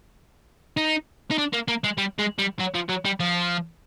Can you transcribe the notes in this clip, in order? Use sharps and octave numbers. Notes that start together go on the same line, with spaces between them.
D#4
D#4
D4
A#3
A#3
G#3
G3
G#3
G3
F#3
F3
F#3
G3
F3